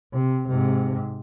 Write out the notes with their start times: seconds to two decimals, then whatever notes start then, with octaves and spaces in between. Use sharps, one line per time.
0.13 C3
0.48 G#2 C3